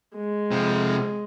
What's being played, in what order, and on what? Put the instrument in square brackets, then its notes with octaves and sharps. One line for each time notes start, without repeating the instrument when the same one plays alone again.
[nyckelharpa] G#3
[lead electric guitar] C3 F3